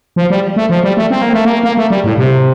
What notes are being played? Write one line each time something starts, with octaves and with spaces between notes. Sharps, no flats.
F3
G3
A3
F3
G3
A3
C4
A#3
A3
A#3
A#3
A3
G3
A2
C3